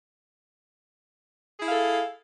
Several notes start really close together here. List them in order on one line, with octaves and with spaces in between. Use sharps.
G#4 E4 F5 A4